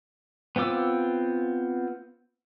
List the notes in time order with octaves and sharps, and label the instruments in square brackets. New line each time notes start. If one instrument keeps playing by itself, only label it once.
[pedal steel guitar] B3 C4 F4 D6 E6